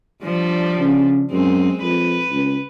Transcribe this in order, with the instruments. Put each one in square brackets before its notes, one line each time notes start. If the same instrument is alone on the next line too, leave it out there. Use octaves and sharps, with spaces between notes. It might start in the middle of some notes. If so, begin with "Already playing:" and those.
[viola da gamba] F3 G3 D4
[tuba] C#3
[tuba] F#2 [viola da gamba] G#3 C4
[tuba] F2 [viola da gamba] B4
[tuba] C#2